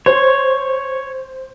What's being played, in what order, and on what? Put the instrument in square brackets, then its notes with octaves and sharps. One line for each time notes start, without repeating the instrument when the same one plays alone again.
[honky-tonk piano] C5 [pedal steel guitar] C#5